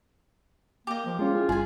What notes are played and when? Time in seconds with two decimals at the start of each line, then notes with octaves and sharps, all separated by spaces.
0.87 A#3 G4 D#5
1.06 F3
1.19 G#3 C#4 F4
1.35 E4 G#4
1.49 G1 G3 G#4 G#5 C6